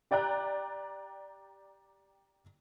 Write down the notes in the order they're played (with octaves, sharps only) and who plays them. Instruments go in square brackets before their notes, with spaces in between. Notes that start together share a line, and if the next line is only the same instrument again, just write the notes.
[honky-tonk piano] G4 D5 G5 A#5 F#6